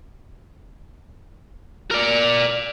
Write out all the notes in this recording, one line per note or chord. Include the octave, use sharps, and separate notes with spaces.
A#4 D5